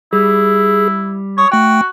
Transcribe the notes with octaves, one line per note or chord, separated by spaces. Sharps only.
G3 E4 G#4
C#5 C#6 D#6
A3 F#4 G5